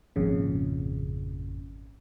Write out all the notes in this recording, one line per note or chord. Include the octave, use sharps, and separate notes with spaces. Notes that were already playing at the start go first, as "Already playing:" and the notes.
G#1 F2 A#2 C#3